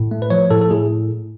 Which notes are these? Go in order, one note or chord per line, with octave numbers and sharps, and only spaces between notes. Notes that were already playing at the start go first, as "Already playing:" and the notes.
Already playing: A2
A3
B4
F3 C#5
A2 A4
A4
A2 G#4